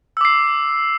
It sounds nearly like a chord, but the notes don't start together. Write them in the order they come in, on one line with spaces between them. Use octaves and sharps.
E6 D6 C7